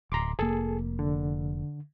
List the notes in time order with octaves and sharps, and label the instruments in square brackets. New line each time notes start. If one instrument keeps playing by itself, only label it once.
[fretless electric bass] D1 [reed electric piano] A#5 C6 D6
[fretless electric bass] F1 A#3 [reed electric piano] G#4 A4
[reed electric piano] D3